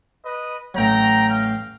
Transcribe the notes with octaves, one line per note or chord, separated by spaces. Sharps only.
B4 D#5
A1 F#3 G5 A#5
F5 G5